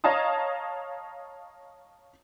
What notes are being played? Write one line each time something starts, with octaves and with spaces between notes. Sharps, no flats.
C#5 D#5 F5 A5 A#5 D#6